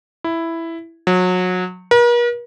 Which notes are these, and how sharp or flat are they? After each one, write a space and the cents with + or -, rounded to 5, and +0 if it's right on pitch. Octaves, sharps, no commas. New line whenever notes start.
E4 +5
F#3 -25
A#4 +45